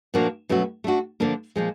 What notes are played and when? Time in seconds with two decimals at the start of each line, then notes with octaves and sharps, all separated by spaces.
0.14 A#2 F3 A#3 D4 F#4
0.49 B2 F#3 A3 C#4 F#4
0.84 A3 D4 F#4
1.20 D3 F3 A#3 D4
1.56 A#2 F3 G#3